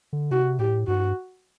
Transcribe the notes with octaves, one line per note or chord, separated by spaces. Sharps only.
D3
C3 F#4
A2 G4
G2 F#4